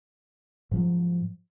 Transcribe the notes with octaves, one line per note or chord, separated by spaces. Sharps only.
G#2 F3 F#3